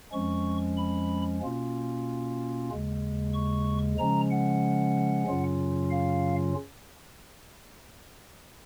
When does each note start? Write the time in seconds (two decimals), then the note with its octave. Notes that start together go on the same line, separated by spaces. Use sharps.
0.13 F2 F3 G#3 C#4 C#6
0.77 B5
1.42 B2 A#3 C#4 F4
2.70 D#2 C#3 G#3
3.33 C#6
3.98 C#3 F3 G#3 C#4 A#5
4.31 F#5
5.27 F#2 C#3 F#3 C#4 F4
5.91 F5